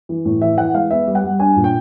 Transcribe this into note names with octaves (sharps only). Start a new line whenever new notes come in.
E3
A2
E3 E5
E3 F#5
G#3 F5
B3 E5
G3
F#5
G3
D4 G#5
A#2
G5